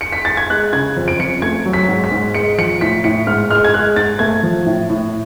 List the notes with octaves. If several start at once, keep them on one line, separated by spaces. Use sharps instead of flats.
C#7
B6
A6
G#6
G#3 F#6
C#3 G#6
F2
D7
F2 C#7
A3 G#6
F#3
B6
G#2
B6
G#2
G#3 C#7
F3 C#7
A2 B6
A2 C#7
G#2 F6
G#3 F6
G#6
G#3 F#6
G#2 A6
A3 G#6
F3
A2
A2